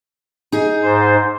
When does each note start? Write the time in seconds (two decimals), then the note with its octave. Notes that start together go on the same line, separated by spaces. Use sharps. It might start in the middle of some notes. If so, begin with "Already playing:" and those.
0.52 D#4 G#4
0.82 G#2 C5